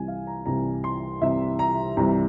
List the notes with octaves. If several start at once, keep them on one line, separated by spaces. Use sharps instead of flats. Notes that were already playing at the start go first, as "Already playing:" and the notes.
Already playing: C2 C3 E3 G3 G#5
F5
A#5
C2 C3 E3 G3 A#5
C6
C2 C3 E3 G3 E5
A#5
C2 C3 E3 G3 A#5